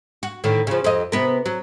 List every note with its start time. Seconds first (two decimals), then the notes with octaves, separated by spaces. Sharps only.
0.23 F#4
0.44 A2 D3 D#3
0.67 C#3 F3
0.84 F2 D#5
1.12 C3 B3 A#4
1.46 F#3